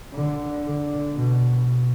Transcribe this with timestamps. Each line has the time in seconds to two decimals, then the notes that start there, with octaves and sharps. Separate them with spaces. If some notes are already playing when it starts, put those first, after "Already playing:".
0.14 D3
0.65 D3
1.14 B2
1.65 B2